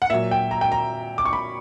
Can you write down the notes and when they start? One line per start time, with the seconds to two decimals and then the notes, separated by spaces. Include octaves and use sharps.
0.02 F#5
0.10 A#2 F#3 E5
0.31 G5
0.51 A#5
0.61 G5
0.72 A#5
1.18 D6
1.25 C#6
1.33 B5